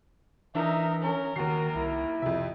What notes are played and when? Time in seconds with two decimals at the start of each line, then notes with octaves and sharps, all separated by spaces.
0.55 E3 D4 D#4 A#4 E5
1.02 C#4 A#4
1.36 D#2 D#3 F#4 C7
1.75 C2 E4
2.22 F2 C3 E5